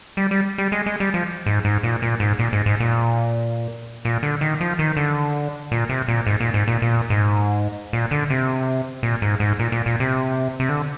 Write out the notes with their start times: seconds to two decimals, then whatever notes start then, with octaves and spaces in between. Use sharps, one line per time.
0.17 G3
0.31 G3
0.58 G3
0.72 G#3
0.86 G#3
1.00 G3
1.14 F3
1.46 G#2
1.65 G#2
1.83 A#2
2.02 A#2
2.20 G#2
2.39 A#2
2.53 G#2
2.66 G#2
2.80 A#2
4.05 A#2
4.23 D3
4.41 D#3
4.61 F3
4.79 D#3
4.97 D3
5.72 A#2
5.89 C3
6.08 A#2
6.27 G#2
6.40 A#2
6.54 G#2
6.68 A#2
6.82 A#2
7.10 G#2
7.93 A#2
8.11 D3
8.30 C3
9.03 A#2
9.22 G#2
9.40 G#2
9.59 A#2
9.72 A#2
9.86 A#2
10.00 C3
10.60 C3
10.69 D3